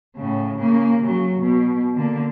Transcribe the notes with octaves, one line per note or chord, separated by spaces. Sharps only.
A2 C#3
C#3 A#3
C#3 F#3
B2
D3 A#3